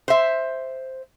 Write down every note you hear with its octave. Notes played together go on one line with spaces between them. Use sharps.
C5 E5